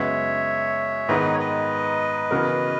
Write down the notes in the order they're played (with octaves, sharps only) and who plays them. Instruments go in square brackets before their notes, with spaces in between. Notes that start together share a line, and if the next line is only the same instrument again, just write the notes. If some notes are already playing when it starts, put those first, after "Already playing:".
Already playing: [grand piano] F#2 C#3 G#3 B3 [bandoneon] C#5 E5
[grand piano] G#2 D#3 G#3 B3 [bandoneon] B4 D#5
[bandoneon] C#5
B4 D#5
[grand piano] C#3 E3 B3 F#4 A#4